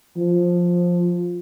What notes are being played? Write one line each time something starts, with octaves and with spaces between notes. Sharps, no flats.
F3